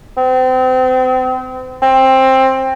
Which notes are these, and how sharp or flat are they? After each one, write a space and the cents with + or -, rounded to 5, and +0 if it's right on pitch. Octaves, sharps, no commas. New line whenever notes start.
C4 -35
C4 +15